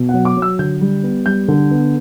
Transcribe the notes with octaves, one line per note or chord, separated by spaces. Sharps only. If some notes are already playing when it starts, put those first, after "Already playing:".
Already playing: B2
F#3 F#5
D6
F#3
E6
D3 G6
G3
B3
G3 G6
D3
B3